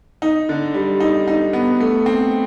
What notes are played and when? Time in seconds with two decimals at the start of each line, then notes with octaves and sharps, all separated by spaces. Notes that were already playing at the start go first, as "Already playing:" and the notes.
0.22 D#4
0.49 D3
0.74 G3
1.00 D#4
1.28 D#4
1.53 B3
1.80 A3
2.06 C4